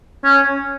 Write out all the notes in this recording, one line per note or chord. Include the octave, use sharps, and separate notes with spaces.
C#4